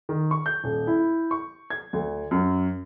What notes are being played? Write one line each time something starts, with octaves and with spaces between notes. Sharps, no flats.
D#3
C#6
G6
D#1
E4
C#6
G#6
D2
F#2